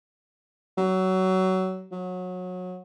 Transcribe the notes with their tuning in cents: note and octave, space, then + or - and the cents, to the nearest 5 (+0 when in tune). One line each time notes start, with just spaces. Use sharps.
F#3 +20
F#3 -25